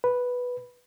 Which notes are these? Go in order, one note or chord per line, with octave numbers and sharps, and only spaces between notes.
B4